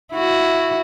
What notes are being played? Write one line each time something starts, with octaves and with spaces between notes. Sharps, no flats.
E4 F#4